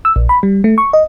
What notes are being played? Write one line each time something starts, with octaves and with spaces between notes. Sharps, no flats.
E6
A#1
B5
G3
A3
C#6
D#5